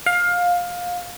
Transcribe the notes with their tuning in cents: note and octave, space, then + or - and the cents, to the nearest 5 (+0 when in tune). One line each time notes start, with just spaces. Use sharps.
F5 +20